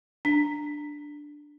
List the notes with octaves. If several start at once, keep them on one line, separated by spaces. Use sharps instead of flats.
D4